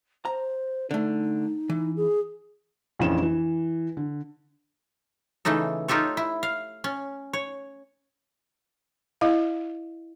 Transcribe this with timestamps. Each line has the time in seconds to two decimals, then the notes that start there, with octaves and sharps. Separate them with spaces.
0.25 C5 A#5
0.91 D3 A3 D#4
1.70 E3
1.96 G#4
2.99 A#1 F2 E3 C#4 E7
3.22 E3
3.97 D3
5.45 C#3 E3 A3 D#4 A4
5.88 D#4 F4 G4 A4 C#5
6.17 E4
6.43 F5
6.84 C#4
7.33 C#5
9.21 E4 D#5 F5